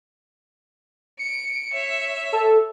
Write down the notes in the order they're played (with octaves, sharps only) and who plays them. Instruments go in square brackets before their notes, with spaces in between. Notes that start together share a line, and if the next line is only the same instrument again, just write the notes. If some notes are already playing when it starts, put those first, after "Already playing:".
[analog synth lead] C#7 [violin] D7
[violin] C#5 E5
[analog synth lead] A4